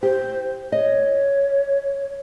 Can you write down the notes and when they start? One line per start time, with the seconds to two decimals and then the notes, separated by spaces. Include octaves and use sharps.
0.03 G4 C5
0.72 C#5 D#5